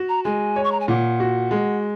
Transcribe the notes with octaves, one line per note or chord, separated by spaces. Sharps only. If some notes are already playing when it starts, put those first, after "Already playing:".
Already playing: F#4
A#5
G#3 G#5
C#5
C#6
A#5
G#5
A#2 F#5
F#4
G#3